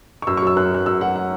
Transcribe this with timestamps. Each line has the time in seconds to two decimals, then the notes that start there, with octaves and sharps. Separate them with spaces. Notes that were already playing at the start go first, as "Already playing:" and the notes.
0.22 C#6
0.27 F#2 E6
0.37 C#6
0.42 F#3 E6
0.56 F#2 F#6
0.71 F#3 F#6
0.86 F#2 E6
1.01 F#3 F#5
1.16 F#5